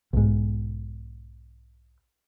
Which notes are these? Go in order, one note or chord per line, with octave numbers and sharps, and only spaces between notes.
B1 G#2